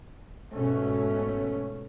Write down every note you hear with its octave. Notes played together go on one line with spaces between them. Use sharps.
G#2 B2 A3 C#4